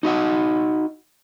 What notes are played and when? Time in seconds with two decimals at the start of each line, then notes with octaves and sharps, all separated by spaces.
0.03 D#4 F#4 D#5 F#5